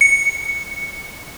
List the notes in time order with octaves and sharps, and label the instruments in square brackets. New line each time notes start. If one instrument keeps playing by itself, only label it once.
[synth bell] C#7